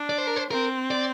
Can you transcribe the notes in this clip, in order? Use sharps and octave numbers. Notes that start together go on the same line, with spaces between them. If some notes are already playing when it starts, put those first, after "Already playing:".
Already playing: D4
D5
C5
A#4
C5
C4 A#4
D5